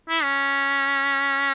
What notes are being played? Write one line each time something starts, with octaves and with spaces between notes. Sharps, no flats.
E4
C#4